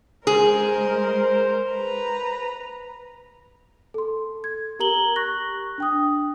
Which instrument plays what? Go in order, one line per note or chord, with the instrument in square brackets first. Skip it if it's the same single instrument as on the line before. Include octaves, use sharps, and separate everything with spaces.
[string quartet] G#3 A#4 [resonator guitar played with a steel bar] G#4 [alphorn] C5
[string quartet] B4 A#5
[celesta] A4 C6
G#6
G4 A#4 A#5 F#7 G7
C#6 F#6 A#6
D4 G5 D#6